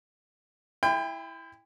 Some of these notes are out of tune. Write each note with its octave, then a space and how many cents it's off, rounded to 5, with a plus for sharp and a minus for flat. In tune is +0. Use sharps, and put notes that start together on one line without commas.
E4 +0 G5 +30 B5 +45